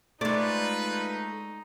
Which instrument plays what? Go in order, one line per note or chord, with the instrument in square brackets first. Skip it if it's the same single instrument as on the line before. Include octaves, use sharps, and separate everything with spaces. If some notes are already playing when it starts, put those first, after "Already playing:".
[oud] G#3 D5 [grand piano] A3 [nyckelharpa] D#4 [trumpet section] F4 B4